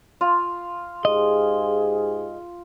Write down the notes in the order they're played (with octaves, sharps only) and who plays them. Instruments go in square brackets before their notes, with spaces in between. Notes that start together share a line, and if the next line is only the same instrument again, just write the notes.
[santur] F4
[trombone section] G#2 G4 G#4 [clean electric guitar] D#5